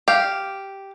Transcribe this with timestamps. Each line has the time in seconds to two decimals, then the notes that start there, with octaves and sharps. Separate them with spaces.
0.08 G4 F5